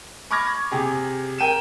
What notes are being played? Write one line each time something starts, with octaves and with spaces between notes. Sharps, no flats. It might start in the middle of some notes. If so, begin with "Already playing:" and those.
B5 C#6 D6 F6 G#6 A#6
C3 G4 G#4
A#4 G5 D#7 E7